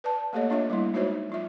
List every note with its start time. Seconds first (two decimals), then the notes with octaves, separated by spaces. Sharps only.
0.04 B4 D5 A5
0.33 A3 A#3 G4 A4 C#5 D#5
0.50 D4 F4 C#5 E5
0.70 G3 A3 A#3 E4
0.93 G#3 D#4 F#4 C5 C#5 E5
1.29 F#3 F4 E5